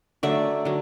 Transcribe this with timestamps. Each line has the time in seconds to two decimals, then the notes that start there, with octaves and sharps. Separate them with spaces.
0.23 D3 F#3 A3 D5 E5
0.65 D3 F#3